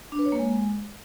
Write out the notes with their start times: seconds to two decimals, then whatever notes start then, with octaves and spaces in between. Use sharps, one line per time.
0.12 D4
0.19 B4
0.26 C#5
0.32 A#3
0.39 G#3